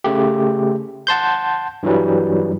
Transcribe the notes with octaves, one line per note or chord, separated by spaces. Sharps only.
C#3 A3 G4
F#5 A5 C6 G6
G2 E3 F#3 G3